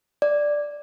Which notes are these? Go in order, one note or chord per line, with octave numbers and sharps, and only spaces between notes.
D5